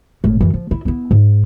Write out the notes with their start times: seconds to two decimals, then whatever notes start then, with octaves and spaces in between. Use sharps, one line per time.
0.24 G#1 A2
0.41 F#2 E3
0.54 F3
0.71 E4
0.85 B3 E4
1.11 G#2